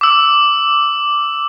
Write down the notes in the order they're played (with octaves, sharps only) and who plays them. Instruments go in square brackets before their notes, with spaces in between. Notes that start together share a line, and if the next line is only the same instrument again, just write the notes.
[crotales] D6 E6